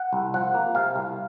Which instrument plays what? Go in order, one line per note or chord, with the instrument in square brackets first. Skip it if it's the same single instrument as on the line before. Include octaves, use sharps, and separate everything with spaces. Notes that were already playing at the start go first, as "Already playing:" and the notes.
Already playing: [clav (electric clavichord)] F#5
C2
F3 F#5
A#3
C3 F5
C2